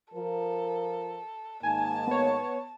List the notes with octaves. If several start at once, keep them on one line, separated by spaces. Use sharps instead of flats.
F3 A4 A#4
G#2 D#3 A#3 G#5 A5
B3 C#5